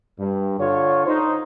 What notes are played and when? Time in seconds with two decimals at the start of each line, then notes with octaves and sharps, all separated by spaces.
0.19 G2
0.59 D3 F4 C#5
1.06 D#4 C5